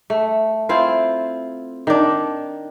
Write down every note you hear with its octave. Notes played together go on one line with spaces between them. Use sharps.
A3
C4 E4 F4 C5
D#3 D4